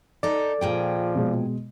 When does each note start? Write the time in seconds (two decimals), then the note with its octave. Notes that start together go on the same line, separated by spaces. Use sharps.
0.23 D#4 A4 D5
0.61 A#2 F3 G#4 G5
1.15 B2 G#3